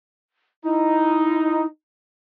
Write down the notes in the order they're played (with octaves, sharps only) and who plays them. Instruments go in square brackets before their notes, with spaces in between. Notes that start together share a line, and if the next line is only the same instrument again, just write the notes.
[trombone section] D#4 [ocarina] E4